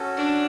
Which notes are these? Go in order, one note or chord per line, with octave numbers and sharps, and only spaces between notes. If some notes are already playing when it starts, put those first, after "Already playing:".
Already playing: C#4 F#4 A4
D4